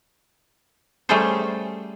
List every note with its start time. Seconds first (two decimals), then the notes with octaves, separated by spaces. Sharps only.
1.09 G3 A3 C#4 G#4 A4 C5